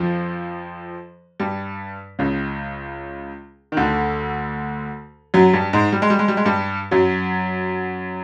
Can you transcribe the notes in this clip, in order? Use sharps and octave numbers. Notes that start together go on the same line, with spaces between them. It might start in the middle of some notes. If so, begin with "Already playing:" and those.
Already playing: F2 F3
G2 G3
C#2 C#3
D#3
D2 D3
F#2 F#3
G2 G3
G#2 G#3
G3
G#3
G3
G#3
G3
G#3
G2 G3
F#2 F#3